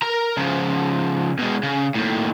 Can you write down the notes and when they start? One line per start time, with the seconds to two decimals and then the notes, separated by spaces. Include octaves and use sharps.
0.02 A#4 A#5
0.37 C#3 F3
1.39 B2 G#3
1.63 C#3
1.96 D#2 A2